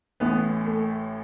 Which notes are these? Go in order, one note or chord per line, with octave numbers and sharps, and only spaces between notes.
A1 A2 E3 B3
A3